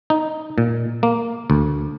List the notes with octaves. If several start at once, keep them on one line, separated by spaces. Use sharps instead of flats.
D#4
A#2
A#3
D2